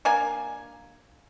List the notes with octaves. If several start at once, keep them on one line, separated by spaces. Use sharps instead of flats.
A#3 D4 G#5